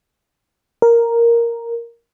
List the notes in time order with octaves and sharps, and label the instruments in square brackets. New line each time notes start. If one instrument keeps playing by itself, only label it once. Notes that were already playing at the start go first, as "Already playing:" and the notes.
[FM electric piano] A#4